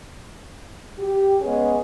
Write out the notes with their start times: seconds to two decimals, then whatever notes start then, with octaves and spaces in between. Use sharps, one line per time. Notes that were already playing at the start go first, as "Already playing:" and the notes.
0.98 G4
1.41 G#3 B3 C#4 G#4